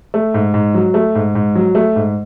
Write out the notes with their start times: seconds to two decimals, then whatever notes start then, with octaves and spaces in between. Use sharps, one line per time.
0.14 A3
0.34 G#2
0.54 G#2
0.75 F#3
0.94 A3
1.15 G#2
1.35 G#2
1.55 F#3
1.75 A3
1.96 G#2